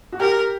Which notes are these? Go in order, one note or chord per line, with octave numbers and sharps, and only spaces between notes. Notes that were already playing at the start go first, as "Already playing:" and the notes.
F#4
G4 A#4